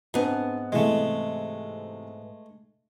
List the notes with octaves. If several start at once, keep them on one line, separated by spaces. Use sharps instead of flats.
G#2 B3 C4 D4
C3 E3 G#3 A3 G#4